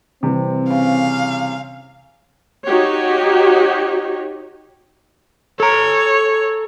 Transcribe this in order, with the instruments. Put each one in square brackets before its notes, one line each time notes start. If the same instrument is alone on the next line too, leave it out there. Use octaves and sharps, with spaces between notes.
[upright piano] C3 E3 G3 [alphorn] C4
[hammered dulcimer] C#3 [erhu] F5
[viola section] D#4 F#4 G4 C#5
[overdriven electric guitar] A4 A#5 [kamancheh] C#5